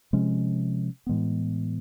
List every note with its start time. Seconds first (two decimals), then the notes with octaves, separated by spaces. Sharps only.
0.13 C3 F3 G#3 C#4
1.07 A2 E3 G#3 B3